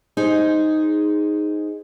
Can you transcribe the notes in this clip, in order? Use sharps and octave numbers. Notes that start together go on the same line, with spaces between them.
D#4 G#4 C5